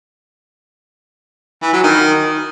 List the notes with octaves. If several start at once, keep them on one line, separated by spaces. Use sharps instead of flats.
E3
F#3
D#3